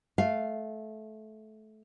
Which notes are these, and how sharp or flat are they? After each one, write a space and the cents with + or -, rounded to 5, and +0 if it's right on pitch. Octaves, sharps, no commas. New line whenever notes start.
A3 -20 F5 +0